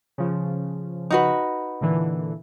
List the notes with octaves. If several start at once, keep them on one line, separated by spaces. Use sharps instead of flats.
C#3 F3
D#4 F#4 B4
A#2 D3 E3